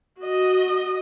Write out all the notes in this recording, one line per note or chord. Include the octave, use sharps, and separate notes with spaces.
F#4 D#5